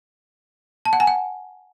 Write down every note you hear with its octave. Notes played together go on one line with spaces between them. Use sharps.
A5
F#5
G#5
F#5